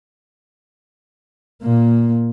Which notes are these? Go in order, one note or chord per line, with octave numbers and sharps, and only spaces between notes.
A#2 A#3